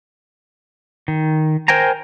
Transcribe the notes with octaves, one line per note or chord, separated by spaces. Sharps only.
D#3
A#4 C5 G5 G#5 A#5